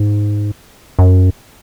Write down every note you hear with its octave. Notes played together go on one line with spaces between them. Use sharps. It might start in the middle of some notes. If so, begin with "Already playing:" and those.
Already playing: G#2
F#2